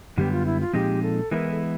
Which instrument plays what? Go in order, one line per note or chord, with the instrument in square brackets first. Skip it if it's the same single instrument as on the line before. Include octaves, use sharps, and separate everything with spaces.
[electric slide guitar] F#2 D3 G3 B3 [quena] G4
[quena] F4
E4
F4
[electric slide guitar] A#2 F3 G#3 C4 D#4 [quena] G4
[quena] A4
[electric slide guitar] E3 G#3 B3 E4 [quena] A#4
[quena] A4